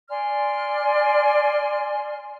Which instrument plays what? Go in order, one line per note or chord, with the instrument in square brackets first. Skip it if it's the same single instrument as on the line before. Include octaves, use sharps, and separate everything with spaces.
[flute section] D5 G#5 C6 F6